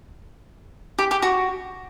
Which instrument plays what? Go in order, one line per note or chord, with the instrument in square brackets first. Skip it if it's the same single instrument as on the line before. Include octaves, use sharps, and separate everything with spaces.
[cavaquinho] G4
G4
F#4